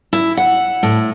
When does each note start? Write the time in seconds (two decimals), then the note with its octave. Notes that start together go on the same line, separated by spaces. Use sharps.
0.13 E4
0.37 F#5
0.83 A2